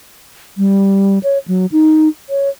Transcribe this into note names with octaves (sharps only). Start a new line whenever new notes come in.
G3
C#5
F#3
D#4
C#5